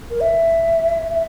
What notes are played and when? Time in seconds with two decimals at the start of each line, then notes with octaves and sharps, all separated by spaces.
0.10 A#4
0.21 E5
1.11 E5